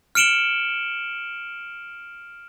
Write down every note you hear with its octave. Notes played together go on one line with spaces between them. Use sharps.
F6 C#7 D7 E7 F#7 G7